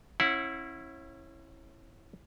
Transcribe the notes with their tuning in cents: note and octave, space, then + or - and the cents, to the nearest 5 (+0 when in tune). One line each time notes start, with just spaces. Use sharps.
C#4 -30 E4 +0 F#5 -20